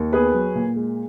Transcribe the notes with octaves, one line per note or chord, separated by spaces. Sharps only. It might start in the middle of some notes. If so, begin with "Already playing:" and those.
Already playing: D#2
B3 G#4 B4
F#3
A#2
G#3